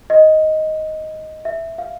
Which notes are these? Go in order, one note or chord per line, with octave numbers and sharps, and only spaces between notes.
D#5
E5
F5